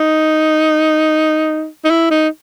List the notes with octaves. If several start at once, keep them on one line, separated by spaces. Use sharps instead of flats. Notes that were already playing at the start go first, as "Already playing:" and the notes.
Already playing: D#4
D#4
E4
D#4